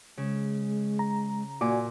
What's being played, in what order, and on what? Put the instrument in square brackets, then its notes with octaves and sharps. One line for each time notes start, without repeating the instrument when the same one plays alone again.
[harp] C#3 [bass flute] G#3
[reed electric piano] A#5
[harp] A#2 D6 [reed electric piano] F#4 D5 G#5